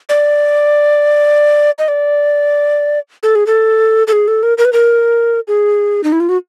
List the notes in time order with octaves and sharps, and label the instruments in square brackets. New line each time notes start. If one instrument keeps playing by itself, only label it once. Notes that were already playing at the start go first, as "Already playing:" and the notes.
[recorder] D5
D#5
D5
A4
G#4
A4
A4
G#4
A4
A#4
A#4
B4
A#4
G#4
D#4
E4
F4
F#4